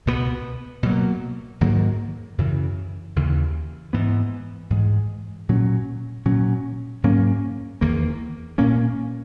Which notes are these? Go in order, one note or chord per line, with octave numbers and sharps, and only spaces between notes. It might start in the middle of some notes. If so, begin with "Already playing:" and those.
C#2 B2 G#3 B3
B2 F#3 A#3
G#2 D#3 F#3 A#3
F#2 C#3 E3
D#2 C#3 E3
G#2 E3 B3
G#2 E3 G#3
A#2 F#3 C#4
A#2 F#3 C#4
G#2 F#3 A#3 C#4
E2 D#3 A#3
A#2 A#3 C#4